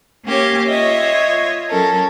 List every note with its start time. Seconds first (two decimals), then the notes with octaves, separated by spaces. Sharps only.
0.25 A#3 C#4 G4 C#5
0.68 F4 C#5 D#5 E5
1.69 F#3 C#4 A4 A#4